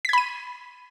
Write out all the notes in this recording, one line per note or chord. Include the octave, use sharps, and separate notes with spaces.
B5 G#6 B6 D#7